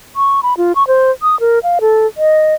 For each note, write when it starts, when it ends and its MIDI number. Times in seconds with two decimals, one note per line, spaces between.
0.16 0.40 85
0.43 0.54 83
0.57 0.73 65
0.75 0.86 85
0.88 1.11 72
1.22 1.39 87
1.40 1.59 70
1.63 1.79 77
1.81 2.07 69
2.17 2.54 75